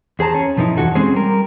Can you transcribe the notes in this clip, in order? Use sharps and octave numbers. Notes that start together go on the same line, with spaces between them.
E2 G#4 C5 A5 A#5
C#4
F#2 B2 F3 A3 D#4 E4
E2 A#2 E3 F#4 A4
G#3 C4 C#4 G#4 C5
G3 A#4